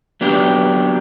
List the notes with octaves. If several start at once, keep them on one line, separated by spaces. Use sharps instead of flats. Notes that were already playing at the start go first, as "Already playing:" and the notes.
F#3 B3 D4 G4